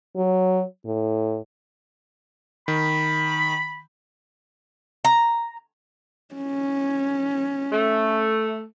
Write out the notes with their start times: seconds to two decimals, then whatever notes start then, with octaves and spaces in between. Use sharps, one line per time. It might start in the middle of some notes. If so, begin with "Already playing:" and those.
0.16 F#3
0.85 A2
2.68 D#3 B5
5.05 A#5
6.35 C#4
7.72 A3